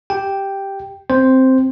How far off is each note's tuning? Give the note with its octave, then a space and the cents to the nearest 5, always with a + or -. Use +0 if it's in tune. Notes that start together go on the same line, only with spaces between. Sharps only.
G4 +0 G5 +0
C4 +0 C5 +0